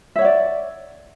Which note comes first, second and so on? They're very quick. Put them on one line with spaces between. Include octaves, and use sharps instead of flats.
E5 C#5 F#5 D5